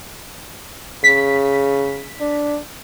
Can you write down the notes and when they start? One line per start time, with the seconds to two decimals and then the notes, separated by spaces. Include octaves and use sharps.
1.04 C#3 B6
2.21 D4